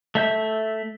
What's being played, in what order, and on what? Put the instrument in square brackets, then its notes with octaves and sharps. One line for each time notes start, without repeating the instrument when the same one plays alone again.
[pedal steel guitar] A3 E5 G6